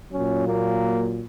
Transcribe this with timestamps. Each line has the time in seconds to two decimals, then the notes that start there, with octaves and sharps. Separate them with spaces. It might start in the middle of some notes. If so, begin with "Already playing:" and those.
0.12 A#2 F#3 C#4
0.47 A#3